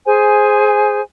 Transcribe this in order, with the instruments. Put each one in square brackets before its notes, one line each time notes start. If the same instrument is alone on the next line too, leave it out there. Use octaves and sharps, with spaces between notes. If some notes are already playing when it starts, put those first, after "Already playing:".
[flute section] G#4 C5 G#5